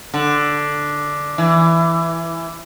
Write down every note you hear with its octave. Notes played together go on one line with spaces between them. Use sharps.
D3
E3